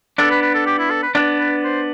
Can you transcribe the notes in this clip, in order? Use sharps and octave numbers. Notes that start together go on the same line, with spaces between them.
B3 D4 A4
B4
B4
A4
G4
E4
A4
B4
B3 D4
B4
C5